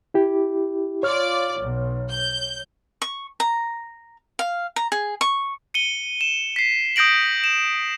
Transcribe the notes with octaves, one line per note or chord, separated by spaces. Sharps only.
E4 G4
F4 C#5 D5 F6
B1
G6
C#6
A#5
F5
A#5
G#4
C#6
C#7 D#7 G7
E7
B6 C7
D#6 G6 A#6 D7 F#7
E7